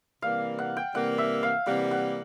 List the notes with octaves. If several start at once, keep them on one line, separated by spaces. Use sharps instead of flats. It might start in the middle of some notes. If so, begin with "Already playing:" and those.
C3 E3 G3 A#3 F5
F#5
G5
C3 E3 G3 A#3 F#5
E5
F5
C3 E3 G3 A#3 F#5
F#5